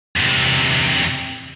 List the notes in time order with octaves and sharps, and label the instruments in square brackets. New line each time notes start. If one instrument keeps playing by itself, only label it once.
[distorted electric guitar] E2 C3